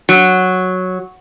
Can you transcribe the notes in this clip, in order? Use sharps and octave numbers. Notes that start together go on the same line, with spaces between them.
F#3